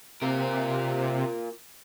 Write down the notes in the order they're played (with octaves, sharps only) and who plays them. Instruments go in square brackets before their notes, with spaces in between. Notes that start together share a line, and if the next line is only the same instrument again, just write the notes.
[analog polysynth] C3 [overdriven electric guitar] F4 A#4